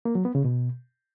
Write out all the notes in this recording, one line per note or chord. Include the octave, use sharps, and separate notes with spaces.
A#3
F#3
B3
C#3
B2